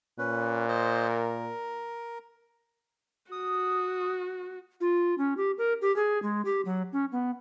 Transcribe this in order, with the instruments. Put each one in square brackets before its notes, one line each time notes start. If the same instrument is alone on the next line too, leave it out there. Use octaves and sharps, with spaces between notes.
[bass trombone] A#2 [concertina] C#4 B4
[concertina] C5 D#5
A#4
[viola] F#4 [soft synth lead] D#6
[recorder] F4
C#4
G4
A#4
G4
G#4
G#3
G4
F#3
C#4
B3